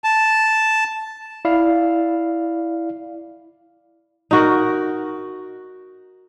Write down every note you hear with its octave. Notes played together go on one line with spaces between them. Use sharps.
A5
E4 D5 F5
D#4 F#4 A#4